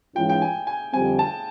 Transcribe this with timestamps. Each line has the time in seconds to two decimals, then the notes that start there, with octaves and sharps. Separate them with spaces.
0.15 G#2 E3 G#3 C#4 F4 G5
0.29 G5
0.42 G#5
0.67 G#5
0.93 F2 D3 G3 C4 G#5
1.19 A5